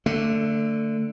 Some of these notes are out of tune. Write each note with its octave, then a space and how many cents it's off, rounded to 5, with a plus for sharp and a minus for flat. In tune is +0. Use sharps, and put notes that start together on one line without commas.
D3 +0 A3 +25